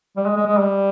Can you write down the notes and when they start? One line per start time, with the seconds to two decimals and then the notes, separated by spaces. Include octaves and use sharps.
0.17 G3
0.26 G#3
0.36 G#3
0.46 G#3
0.58 G3